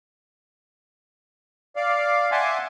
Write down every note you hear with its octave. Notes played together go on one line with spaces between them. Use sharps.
D5 F5
E5 F#5 G#5 A5 C6 D6